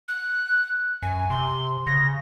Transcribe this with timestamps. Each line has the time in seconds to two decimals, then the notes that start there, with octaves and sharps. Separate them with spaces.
0.08 F#6
1.02 F#2 G#5
1.30 C3 C6
1.87 C#3 A#6